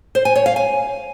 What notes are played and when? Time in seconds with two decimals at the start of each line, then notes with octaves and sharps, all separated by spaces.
0.15 C5
0.25 G#5
0.35 C#5
0.46 F5
0.56 G#5